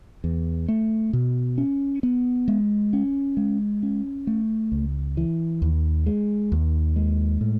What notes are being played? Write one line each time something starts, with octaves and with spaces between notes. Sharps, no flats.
E2
A3
B2
C#4
B3
G#3
C#4
G#3
C#4
A3
C#2
E3
D#2
G#3
D#2
G#3
A2